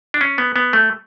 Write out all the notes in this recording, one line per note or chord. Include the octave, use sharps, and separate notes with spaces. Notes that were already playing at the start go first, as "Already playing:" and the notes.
D4
C#4
B3
B3
A3